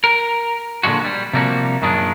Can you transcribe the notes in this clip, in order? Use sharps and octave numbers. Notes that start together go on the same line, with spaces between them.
A#4
A#2 D3 F3 G#3 F#4
G3
C3 F3 G3 A#3 F#4
F#2 A#2 D#3 G#3 D4